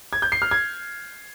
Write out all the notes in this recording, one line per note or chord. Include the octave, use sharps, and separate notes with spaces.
G#6
G6
C7
F6
G#6